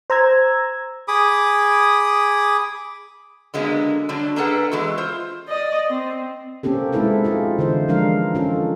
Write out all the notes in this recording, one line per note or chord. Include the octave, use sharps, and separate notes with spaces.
C5 A#5 E6 G#6
G#4 B5 D6 D#6
D3 F#3 G#3 A#3 B3
D3 F#3 G3 D4
A#3 D4 G#4 A4 B4 F#5
E3 G#3 B3 F#4
F4 C5
D5 D#5
C4
A#3 C4 C#4 G4 A4
G#3 C4 D#4 E4 A4 B4
F4 G#4 D#5
D3 E3 E4 C5
E3 F3 G#3 D4 A#4 F5
C#4 F4 A4